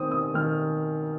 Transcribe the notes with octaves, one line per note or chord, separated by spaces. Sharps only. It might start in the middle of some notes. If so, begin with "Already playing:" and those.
Already playing: D#3 C4 D#6
D#6
D#3 F6